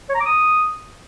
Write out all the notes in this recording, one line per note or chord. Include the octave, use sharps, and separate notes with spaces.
C#5
A#5
D6
D#6